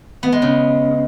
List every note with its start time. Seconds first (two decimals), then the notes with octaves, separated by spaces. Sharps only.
0.23 B3
0.32 G#3
0.42 C#3